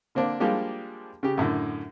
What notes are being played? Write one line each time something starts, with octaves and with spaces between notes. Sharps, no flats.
D3 A#3 C4 D4
F3 G3 G#3 A#3 D4 G4
C#3 G4
F#2 A2 D3